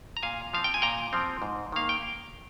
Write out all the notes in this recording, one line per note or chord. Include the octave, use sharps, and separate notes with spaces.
A#5
A#2 F5 G#5
F3 C4 F5
G5
G#5
A#2 G5 A#5
F3 C4
G#2
D#3 A#3 F5
G5